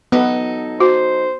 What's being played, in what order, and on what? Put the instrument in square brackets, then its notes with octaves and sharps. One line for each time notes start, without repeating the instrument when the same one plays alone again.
[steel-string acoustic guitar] F#3 D#4 A4 [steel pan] B3
[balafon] F#4 [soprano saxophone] C5